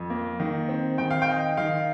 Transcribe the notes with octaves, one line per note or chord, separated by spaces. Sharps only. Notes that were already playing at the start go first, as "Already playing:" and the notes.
Already playing: F2
A#3
D#3
C4
D#3 G5
F5
G5
D#4
D#3 F5